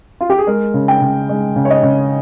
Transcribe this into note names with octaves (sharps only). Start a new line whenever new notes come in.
F4
G4
G#4
G#3 A#4
C#3
G5
C#3
G#3
C#3
C#5
D#5
C#3